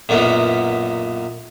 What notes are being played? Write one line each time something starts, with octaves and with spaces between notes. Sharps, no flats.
B1 F#2 A#2 E3 A#3 B3